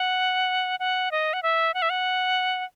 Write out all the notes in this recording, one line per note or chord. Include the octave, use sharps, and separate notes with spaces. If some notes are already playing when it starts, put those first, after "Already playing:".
Already playing: F#5
F#5
D#5
F#5
E5
F#5
E5
F#5